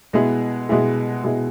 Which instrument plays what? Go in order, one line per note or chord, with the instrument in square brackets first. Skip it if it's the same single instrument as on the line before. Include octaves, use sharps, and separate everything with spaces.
[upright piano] B2 G#3 B3 E4 G#4
B2 G#3 B3 E4 G#4
B2 G#3 B3 E4 G#4